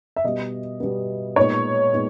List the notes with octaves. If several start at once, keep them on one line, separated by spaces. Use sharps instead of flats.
E5
B2 G3 B3 D#5
B2 G3 B3
A#2 G#3 B3 D#4 C#5
A#2 G#3 B3 D#4